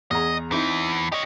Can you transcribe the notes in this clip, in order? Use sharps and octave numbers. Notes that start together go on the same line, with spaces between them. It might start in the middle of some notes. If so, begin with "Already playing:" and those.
E2 G#4 D#5 A#5
E2 E3 C4 D#4 E4
G4 C#5 D#5